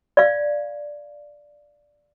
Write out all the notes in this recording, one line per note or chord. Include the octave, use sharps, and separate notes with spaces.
D5 F5